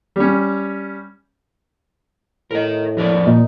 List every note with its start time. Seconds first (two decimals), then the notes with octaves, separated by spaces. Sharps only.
0.16 G3 C#4
2.51 A2 A#4 D#5
2.97 F2 A#4 D5
3.27 A#2 D#4